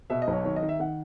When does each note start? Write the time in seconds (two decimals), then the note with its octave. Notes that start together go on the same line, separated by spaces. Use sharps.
0.10 B2 E5
0.22 D#5
0.28 B1
0.33 C#5
0.45 D#3 C#5
0.56 D#5
0.63 D#3
0.69 E5
0.80 D#3 F#5